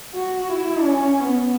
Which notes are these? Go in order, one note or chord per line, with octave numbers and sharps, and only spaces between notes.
F#4
E4
C#4
B3